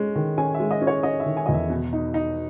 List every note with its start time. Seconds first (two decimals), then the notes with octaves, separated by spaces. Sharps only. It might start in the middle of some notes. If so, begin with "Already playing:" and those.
Already playing: G#3 C#4
0.15 D#3
0.38 C#4 G#5
0.54 E5
0.60 G#3
0.71 D#5
0.82 C#4
0.87 C#5
1.03 C#4 D#5
1.20 E5
1.26 D#3
1.37 G#5
1.46 D#5
1.49 E2
1.54 E5
1.70 B2
1.93 D#4
2.14 D#4